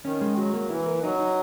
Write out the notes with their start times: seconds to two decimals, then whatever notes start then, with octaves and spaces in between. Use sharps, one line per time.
0.05 D#3 C#4
0.21 G#3
0.37 F#3 F#4
0.53 A#3
0.70 E3 E4
0.86 A#4
1.03 F#3 D#4
1.19 D#4